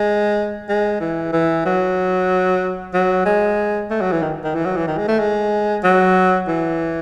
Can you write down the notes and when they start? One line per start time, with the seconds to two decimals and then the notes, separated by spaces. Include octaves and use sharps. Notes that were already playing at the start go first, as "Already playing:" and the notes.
Already playing: G#3
0.69 G#3
1.00 E3
1.33 E3
1.66 F#3
2.94 F#3
3.25 G#3
3.91 A3
4.01 F#3
4.12 E3
4.23 D#3
4.44 D#3
4.55 E3
4.65 F#3
4.76 E3
4.87 D#3
4.98 G#3
5.08 A3
5.19 G#3
5.84 F#3
6.48 E3